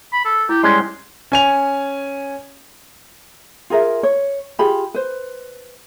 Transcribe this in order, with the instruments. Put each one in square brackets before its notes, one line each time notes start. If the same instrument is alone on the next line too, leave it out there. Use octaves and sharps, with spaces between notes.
[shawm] B5
A4
[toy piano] E4 [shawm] G4
[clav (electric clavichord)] G3 G#3 C#4 [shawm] C6
[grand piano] C#4 G#5 F7
[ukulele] F4 G#4 A#4 E5
C#5
F4 G4 G#4 B5
B4 C5